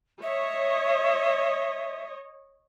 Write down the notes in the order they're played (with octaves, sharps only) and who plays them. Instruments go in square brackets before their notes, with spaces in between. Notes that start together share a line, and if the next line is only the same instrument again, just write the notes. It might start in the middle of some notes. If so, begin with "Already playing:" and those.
[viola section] C#5 D#5 [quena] E5